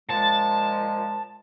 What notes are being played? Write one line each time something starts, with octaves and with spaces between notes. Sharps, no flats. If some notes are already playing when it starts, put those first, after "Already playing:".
A#2 F3 G#3 A5